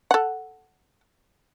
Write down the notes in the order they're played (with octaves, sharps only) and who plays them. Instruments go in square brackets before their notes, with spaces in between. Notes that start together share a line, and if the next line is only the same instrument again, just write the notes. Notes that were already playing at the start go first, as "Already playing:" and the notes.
[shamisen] A4 F#5